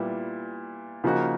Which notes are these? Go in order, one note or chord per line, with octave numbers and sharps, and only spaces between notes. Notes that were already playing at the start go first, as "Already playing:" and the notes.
Already playing: A#2 G3 B3 E4
C#3 F3 A#3 D#4 F#4